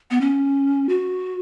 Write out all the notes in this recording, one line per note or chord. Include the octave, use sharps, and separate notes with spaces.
B3
C#4
F#4